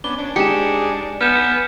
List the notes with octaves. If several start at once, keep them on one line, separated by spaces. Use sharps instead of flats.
B3 C#4 D4 G7
C#4 D4
G#3 D#4 G4 G#4 C#7 E7
B3 G#5 F6 G6 E7